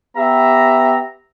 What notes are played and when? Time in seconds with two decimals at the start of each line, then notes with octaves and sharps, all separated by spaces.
0.16 B3 G4 E5 A#5